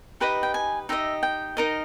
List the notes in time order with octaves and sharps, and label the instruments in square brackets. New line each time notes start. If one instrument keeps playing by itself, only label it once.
[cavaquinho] D#4 G4 B4 D#5 B5
G5
G#5
D#4 G4 B4 D#5 E5
G5
D#4 A#4 D#5